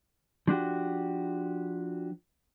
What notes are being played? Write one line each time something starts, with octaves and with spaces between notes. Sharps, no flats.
F3 D4 F#4 G4